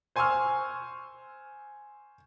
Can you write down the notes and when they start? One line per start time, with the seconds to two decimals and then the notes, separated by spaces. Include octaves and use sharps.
0.16 C5 G#5 C6 C#6 E6 F6